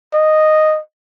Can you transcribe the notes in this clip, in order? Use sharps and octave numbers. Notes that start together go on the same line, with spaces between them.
D#5